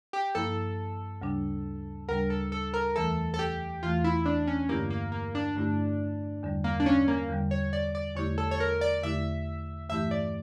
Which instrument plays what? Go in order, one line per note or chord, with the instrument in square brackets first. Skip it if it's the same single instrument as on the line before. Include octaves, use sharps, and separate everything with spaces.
[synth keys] G4
[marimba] G2 F3 A#3 E4 [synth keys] A4
[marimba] D2 C#3 G3 D4
[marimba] D2 C#3 G3 D4 [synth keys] A#4
[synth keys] A4
A4
A#4
[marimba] E2 E3 A3 [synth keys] A4
[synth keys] A4
G4
[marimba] E2 E3 A3 [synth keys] F4
[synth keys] E4
D4
C#4
[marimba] G2 D3 A3 E4 G4 [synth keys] A#3
[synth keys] A#3
A#3
D4
[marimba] G2 D3 A3 E4 G4
E2 D3 G3
[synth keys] A#3
D4
C#4
A#3
[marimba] E2 D3 G3
[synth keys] C#5
D5
D5
[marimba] E2 D3 A3 E4 G4 [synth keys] C#5
[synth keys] A4
C#5
A#4
D5
[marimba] E2 D3 A3 E4 G4 [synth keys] E5
[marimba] G2 E3 A3 E4 G4 [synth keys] E5
[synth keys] D5